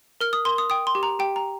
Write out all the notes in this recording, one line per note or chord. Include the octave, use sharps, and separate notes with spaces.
A#4 F6
D#6
A#4 C6
D#6
G5 D#6
C6
G4
A#5
G4 G5
A#5